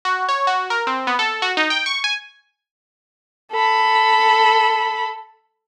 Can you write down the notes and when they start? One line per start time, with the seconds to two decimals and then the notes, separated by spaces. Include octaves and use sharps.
0.05 F#4
0.29 C#5
0.47 F#4
0.70 A#4
0.87 C4
1.07 B3
1.19 A4
1.42 F#4
1.57 D#4
1.70 G5
1.86 C#6
2.04 G#5
3.52 A4 B5